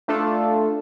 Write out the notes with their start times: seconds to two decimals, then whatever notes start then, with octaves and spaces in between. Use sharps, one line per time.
0.08 A3 D4 F4 A4